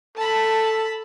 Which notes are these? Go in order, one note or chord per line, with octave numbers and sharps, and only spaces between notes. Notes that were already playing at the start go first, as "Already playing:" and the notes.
A4 A5 B5